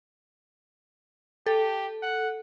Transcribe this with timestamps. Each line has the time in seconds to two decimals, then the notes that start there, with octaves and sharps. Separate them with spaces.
1.46 G4 A4
2.02 F#5